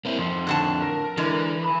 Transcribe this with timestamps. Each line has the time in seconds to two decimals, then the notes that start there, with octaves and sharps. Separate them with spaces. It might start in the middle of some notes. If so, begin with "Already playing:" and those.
0.05 A#3 C4 E4
0.19 F2 D#3 F3 C6
0.47 A2 D3 A5
0.82 A#4
1.17 D3 E3 G#3
1.64 G#5 B5